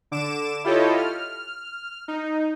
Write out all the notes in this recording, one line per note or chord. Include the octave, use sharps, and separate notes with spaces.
D3 D6 D7 E7
E4 F4 G4 A4 C#5 D#5
F6
D#4